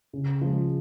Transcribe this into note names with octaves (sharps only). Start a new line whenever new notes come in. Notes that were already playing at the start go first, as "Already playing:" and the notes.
C#3
F3 G#3